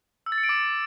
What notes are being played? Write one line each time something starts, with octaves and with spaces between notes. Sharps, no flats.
E6
A6
C#7
D7
D6